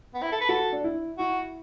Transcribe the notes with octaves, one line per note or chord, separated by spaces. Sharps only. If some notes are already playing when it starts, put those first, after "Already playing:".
B3
E4
A4
B4
F#4 A4
D4
E4
E4 F#4